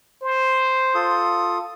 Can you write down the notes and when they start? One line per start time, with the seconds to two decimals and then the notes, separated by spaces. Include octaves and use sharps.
0.23 C5
0.95 F4 A4 D#6